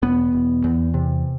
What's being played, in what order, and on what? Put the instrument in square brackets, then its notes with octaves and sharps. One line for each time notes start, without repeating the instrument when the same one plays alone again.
[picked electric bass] E1 B3
E1
E2
C3